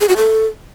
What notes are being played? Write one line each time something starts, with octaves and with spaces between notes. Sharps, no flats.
G#4
F#4
A4